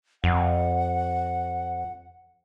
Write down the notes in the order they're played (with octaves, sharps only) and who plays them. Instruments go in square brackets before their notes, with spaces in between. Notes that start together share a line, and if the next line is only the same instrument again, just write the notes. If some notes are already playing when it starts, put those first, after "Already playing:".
[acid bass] F2 [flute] F#5